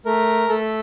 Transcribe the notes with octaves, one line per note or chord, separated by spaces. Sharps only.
A3 A#4
A3 A4